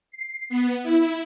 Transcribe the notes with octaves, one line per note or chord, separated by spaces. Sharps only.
C7
B3
E4